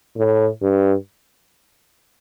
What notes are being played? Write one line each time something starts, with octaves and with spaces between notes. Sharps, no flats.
A2
G2